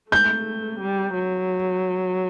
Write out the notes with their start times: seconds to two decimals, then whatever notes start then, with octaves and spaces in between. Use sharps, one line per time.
0.11 A3 G6
0.80 G3
1.14 F#3